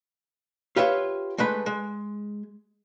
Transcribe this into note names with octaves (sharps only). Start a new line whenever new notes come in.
F4 G4 B4 C#5 E5
G#3 A3 B4 B5
G#3